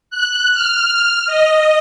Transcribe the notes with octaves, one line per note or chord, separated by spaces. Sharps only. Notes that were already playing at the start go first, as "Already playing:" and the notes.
F#6
F6
D#5